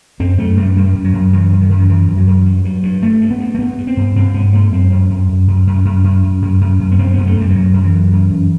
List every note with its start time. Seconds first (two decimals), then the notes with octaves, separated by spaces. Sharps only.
0.20 F#2 C4
0.38 F#2 A3
0.57 F#2 G3
0.76 F#2 G3
0.95 F#2
1.04 F#3
1.13 F#2
1.33 F#2 E3
1.52 F#2
1.61 D#3
1.70 F#2
1.79 D#3
1.89 F#2 E3
2.08 F#2
2.17 F#3
2.27 F#2
2.45 G2
2.65 G2
2.83 G2
3.02 G2 A3
3.21 G2
3.31 B3
3.40 G2
3.55 A3
3.59 G2 B3
3.78 G2
3.87 C4
3.97 G2
4.16 G2 C4
4.34 G2 B3
4.53 G2 A3
4.72 F#2 C4
4.91 F#2
5.10 F#2
5.29 F#2
5.48 F#2
5.67 F#2
5.85 F#2
6.04 F#2
6.23 F#2
6.42 F#2
6.61 F#2
6.80 F#2
6.92 B3
6.99 F#2 C4
7.13 F#2 B3
7.27 A3
7.37 F#2 G3
7.50 G3
7.55 F#2 F#3
7.73 F#2
7.84 E3
7.93 F#2
8.12 F#2
8.31 F#2